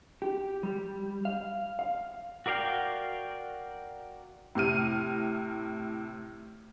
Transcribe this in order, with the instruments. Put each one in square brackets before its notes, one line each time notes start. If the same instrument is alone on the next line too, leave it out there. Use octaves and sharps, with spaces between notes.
[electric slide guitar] G4
G3
F5
F5
[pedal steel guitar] F#4 A#4 D5 F5 G5
[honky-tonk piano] A2 C3 F6 D#7